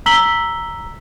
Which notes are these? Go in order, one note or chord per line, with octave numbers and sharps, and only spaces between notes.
A#5 E6 B6 F#7 G7